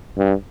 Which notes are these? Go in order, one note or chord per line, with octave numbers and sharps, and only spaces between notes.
G2